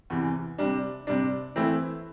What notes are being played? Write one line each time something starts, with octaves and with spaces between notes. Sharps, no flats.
E2 C3 E3
C3 G3 D4
C3 G3 D4
E3 A3 C4 E4